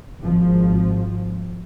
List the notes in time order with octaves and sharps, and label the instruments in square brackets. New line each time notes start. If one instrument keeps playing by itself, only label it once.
[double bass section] G#1 F3